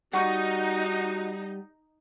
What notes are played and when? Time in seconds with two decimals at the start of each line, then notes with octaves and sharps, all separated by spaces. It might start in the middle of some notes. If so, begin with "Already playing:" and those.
0.13 G3 D#4 F#4 F#5 C#6 F6